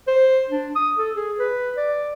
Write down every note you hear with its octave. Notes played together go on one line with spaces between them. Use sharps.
C5
D4
D#6
A4
G#4
B4
D5